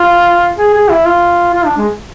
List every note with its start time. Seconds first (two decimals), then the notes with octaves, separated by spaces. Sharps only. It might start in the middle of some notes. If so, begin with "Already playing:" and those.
Already playing: F4
0.58 G#4
0.74 G#4
0.90 E4
1.06 F4
1.54 F4
1.66 D4
1.77 G#3